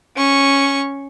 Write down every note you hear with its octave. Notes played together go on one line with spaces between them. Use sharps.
C#4 C#6